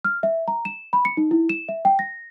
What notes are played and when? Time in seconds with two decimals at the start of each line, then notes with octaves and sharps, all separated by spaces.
0.05 F6
0.23 E5
0.48 A#5
0.65 E7
0.93 B5
1.05 C#7
1.17 D#4
1.31 E4
1.49 E7
1.69 E5
1.85 G5
1.99 A#6